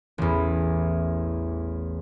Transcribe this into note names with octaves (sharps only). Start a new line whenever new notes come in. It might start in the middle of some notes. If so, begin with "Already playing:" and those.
A1 E2